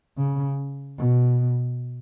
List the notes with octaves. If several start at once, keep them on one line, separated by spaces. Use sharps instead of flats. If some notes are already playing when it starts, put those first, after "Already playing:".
C#3
B2